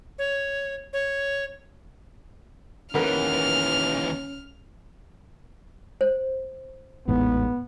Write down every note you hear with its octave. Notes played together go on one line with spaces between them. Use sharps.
C#5
C#5
D#2 E3 C#4 A#4 B4 F#5 F6
C5
A1 E2 G#2 B3